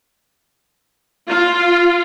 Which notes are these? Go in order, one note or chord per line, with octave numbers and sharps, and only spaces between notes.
F4